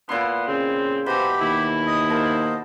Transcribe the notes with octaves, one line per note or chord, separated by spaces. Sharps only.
A#2 B3 E4 C6
C#3 C4
B2 E3 G4 C5 B5
D#2 E4
D#5 D#6
A#3 C5 D#5 A5